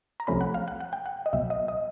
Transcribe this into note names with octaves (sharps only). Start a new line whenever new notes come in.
A#5
C2 C3 F3 A3 C#4 B5
F#5
F5
F#5
F#5
G5
F#5
D#5
C2 B2 F#3 E5
D#5
D#5